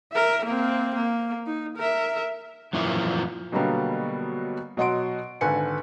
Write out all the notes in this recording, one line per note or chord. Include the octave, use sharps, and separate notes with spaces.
A#4 E5
A#3 C4
A#3
D#4
A#4 E5
F#2 A#2 E3 F3
B2 D3 F#3 G3 A#3 B3
B2 F#3 D#5 F#5 C6 D7
G#1 D3 B4 G#5 C#7